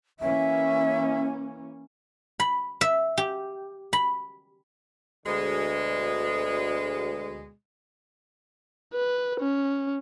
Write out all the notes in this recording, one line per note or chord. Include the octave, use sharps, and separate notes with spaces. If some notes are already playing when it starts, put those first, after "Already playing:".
E3 A#3 C#4 E5
B5
E5
G4
B5
D2 B2 D3 G#3
B4
C#4